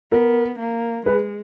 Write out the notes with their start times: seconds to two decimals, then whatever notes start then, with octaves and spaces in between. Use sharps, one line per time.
0.12 B3 A#4
0.59 A#3
1.06 G#3 G#4 B4